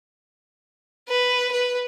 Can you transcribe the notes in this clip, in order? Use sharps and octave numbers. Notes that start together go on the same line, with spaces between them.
B4
B4